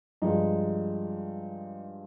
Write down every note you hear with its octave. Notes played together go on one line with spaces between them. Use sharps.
G2 F3 G#3 D#4